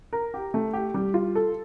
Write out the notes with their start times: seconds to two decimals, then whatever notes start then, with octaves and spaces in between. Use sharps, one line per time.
0.13 A#4
0.34 G4
0.54 A3
0.73 G4
0.94 G3
1.14 F4
1.35 A4